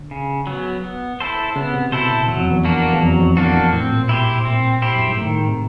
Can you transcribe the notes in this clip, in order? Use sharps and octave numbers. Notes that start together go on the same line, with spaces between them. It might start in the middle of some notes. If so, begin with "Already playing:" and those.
Already playing: D3
C#3
F#3 B3
B3
E4 A4 C5
C#3 B3
C3
B2 E4 A4 C5
A#2
E2 F#3
F2
E2
A#3 D4 F#4
E2
F2 F#3
F2
E2 A#3 D4 F#4
E2
A2 C4
A#2
B2 E4 G4 C5
A#2 C4
E4 G4 C5
F#2
G2
G#2
A2 D#3
G#2
C3